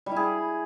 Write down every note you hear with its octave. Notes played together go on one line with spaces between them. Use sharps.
G3
E4
G#4